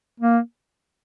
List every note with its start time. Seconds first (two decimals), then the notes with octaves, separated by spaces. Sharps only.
0.20 A#3